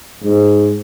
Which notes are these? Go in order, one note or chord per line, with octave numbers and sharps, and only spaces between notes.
G#2